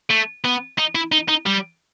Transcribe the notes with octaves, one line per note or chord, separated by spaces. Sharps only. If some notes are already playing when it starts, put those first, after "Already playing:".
A3
B3
D#4
E4
D#4
D#4
G3